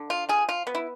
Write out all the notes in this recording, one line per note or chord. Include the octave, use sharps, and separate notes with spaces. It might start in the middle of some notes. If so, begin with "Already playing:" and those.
Already playing: D3
F4
F3 G#4
F4
B3
E4